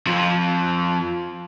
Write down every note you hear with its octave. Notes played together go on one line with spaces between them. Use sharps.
F2 F3